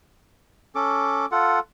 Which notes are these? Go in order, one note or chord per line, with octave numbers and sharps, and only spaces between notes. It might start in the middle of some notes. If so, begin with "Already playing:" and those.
C#4 A4 D6
F4 A4 F#5